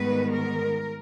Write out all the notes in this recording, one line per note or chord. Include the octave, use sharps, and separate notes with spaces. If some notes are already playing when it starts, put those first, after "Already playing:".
Already playing: G#2 D#3 G3 B3 B4
A#4